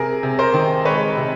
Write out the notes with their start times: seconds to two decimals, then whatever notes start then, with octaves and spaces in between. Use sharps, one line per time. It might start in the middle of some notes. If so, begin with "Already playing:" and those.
Already playing: C3 G#4 A#4
0.23 C3
0.39 A#4 C5
0.54 D#3
0.85 G#3 B4 C#5
1.17 C3